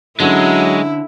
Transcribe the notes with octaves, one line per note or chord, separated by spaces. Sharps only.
D3 F#3 G#3 C#4 E4